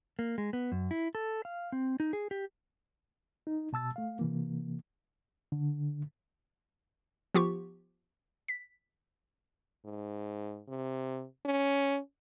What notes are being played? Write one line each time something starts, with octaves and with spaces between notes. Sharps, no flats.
A#3
G#3
B3
F#2
E4
A4
F5
C4
D#4
G#4
G4
D#4
B2 A5 E6 A6
A3 F5
C3 E3 A#3
D3
F3 B3 F4 G4 C#6
B6
G#2
C3
C#4